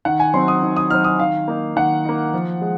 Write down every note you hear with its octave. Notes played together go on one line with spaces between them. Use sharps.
D#3 F#5
G#5
F#3 C4 D#4 C6
D#6
D#3
D#6
F#3 C4 D#4 F6
D#6
D#3 F5
A#3 D#4
D#3 F#5
A#3 D#4
F3
G#3